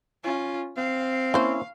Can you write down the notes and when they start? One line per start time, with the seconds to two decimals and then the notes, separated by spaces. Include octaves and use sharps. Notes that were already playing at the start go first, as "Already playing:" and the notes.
0.23 C#4 F4
0.77 C4 F5
1.34 A#3 C#4 E4 C5